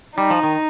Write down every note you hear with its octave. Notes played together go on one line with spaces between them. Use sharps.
G3 D#4
F3
D#3